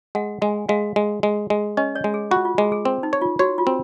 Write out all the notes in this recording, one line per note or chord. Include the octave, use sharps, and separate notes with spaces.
G#3 F#5
G#3 G#5
G#3 F5
G#3
G#3
G#3
C#4 D#5
C#5
G#3
G#4
F4 F#4
F4
G#3 G#4
G#4
C4
D#4
C#5
F4
F#4 C#5
F4
C4